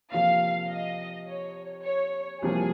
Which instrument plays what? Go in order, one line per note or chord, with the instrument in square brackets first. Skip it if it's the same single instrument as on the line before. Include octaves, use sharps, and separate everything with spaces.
[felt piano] C3 F3 A#3 [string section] F5
[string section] D#5
C#5
C#5
[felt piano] C2 C3 F3 A#3 [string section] G#4